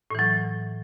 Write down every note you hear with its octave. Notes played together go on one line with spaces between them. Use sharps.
A2 E3 F#3